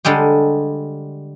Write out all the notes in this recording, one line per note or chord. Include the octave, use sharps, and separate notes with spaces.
D3 G3 G#3 G4